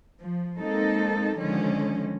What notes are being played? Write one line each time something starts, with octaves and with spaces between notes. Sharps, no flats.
F3
G#3 A#3 C4 D#4 A4
D3 D#3 F3 G#3 C#4